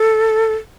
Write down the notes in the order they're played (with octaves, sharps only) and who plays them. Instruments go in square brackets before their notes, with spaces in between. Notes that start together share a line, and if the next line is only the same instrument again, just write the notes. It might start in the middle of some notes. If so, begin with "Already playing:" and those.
Already playing: [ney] A4